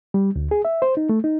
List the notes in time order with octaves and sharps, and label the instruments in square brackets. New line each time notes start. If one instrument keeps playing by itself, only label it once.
[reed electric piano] G3
D2
G#4
E5
C5
D#4
A3
D#4